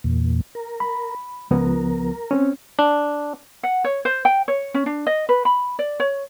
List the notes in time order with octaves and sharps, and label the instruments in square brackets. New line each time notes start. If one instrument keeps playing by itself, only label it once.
[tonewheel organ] E2 A#2
A#4
[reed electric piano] B5
[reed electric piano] C#2 F3 B3 [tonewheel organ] A#4
[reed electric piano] C4 C#4
[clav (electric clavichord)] D4
[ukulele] F#5
C#5
C5
G5
C#5
C#4
D4
D#5
B4
B5
D5
C#5